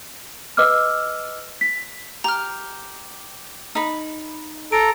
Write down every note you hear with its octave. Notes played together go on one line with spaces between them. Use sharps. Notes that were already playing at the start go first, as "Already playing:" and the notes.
B4 D#5 D6 E6 F6
B6
G4 A#5 F6
D#4 B5
A4 A#5 D7